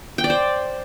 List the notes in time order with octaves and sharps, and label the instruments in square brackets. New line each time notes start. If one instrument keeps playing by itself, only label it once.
[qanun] G5
D5
C5